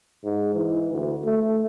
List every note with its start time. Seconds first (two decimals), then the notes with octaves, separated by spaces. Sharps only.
0.24 G#2
0.54 E3
0.92 D2
1.25 A3